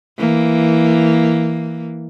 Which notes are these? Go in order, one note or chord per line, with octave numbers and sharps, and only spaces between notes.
E3 A#3